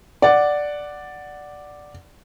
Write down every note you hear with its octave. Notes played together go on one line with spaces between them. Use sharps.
D5 F#5